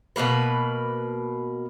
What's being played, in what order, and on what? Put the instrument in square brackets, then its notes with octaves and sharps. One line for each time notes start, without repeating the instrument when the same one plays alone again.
[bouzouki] B2 E3 A#3 B4